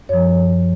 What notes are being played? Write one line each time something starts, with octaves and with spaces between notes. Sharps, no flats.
F#2 F3 C#5